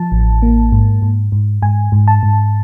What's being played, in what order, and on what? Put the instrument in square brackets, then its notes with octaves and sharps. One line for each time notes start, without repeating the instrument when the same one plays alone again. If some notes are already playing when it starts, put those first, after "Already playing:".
Already playing: [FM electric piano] F3 A5
A1
A#3
G#2
G#2
G#2
G#2 G#5
G#2
A5
G#2